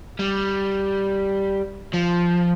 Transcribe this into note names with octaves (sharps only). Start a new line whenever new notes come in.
G3
F3